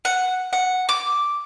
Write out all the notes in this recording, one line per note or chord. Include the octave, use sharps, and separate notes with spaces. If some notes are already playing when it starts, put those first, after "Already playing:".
F#5
F#5
D6